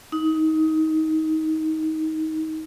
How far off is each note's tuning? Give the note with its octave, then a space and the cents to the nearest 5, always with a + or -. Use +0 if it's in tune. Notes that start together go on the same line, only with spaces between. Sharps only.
D#4 +20